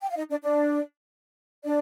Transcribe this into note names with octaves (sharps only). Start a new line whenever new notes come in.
G5
F5
D#4 D#5
D4 D5
D4 D5
D4 D5